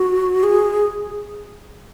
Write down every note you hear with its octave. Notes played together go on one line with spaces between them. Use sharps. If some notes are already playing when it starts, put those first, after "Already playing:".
Already playing: F#4
G#4